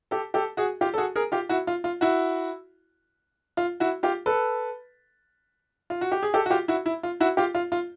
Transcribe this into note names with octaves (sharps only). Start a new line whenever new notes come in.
G4 A4
G4 A4
F#4 G#4
F4 G4
A4
F#4 G#4
G#4 A#4
F4 G4
E4 F#4
F4
F4
E4 F#4
F4
E4 F#4
F4 G4
A4 B4
F4
F#4
G4
G#4
G4 A4
F#4
F4 G4
E4 F#4
E4
F4
E4 F#4
F4 G4
F4
F4